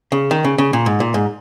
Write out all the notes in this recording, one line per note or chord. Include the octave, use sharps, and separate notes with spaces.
C#3
D#3
C#3
C#3
A#2
G#2
A#2
G#2